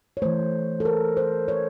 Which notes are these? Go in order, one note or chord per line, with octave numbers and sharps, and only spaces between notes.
C#5
E3 A3 C5
A4
A#4
C5
C#5